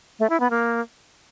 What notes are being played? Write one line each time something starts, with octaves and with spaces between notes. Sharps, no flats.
A3
E4
B3
A#3